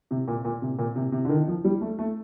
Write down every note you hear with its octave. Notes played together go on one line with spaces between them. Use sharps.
C3
A#2
A#2
C3
A#2
C3
C3
D3
D#3
F3
G3
A3
A3